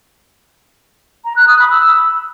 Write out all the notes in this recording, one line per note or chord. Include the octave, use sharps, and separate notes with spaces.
A#5
F#6
D#6
B5
E6